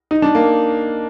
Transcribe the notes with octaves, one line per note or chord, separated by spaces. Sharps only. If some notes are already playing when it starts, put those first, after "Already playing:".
D#4
D4
A#3